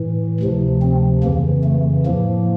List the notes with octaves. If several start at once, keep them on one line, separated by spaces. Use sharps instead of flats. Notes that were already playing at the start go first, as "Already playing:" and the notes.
Already playing: A2 E3
D2 C3 F3
C4
F2 C#3 E3 A#3
A3
A2 F3 A#3